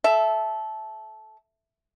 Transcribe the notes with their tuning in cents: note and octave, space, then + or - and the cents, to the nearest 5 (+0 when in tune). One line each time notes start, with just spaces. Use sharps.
A4 -15 E5 +0